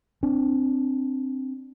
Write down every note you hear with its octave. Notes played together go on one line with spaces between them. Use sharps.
C4 D4